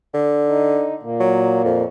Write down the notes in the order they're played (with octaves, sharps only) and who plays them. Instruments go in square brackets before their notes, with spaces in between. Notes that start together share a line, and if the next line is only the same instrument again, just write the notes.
[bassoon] D3
[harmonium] D#4
A#2 A#3
[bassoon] F#3
F2